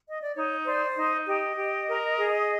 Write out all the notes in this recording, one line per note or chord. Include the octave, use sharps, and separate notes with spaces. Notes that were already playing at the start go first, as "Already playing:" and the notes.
D#5
D5
D#4 C#5
C5 D5
D#4 D#5
G4 D#5
G4
A#4
G#4